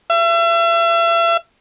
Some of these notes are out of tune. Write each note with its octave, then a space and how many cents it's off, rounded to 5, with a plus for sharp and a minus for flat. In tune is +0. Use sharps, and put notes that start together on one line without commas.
E5 +35